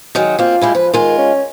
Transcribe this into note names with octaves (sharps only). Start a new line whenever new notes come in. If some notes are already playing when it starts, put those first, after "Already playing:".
D#3 F#3 G#3
A#3 C4 F4
G3 G#3 E4
F3 B4
D#3 G#3 F4
C#4